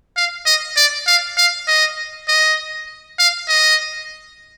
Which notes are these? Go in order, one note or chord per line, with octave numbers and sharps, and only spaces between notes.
F5
D#5
D5
F5
F5
D#5
D#5
F5
D#5